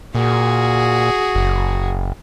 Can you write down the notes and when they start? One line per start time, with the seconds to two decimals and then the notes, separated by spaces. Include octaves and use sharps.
0.15 A#2 F#4 G#4
1.35 F#1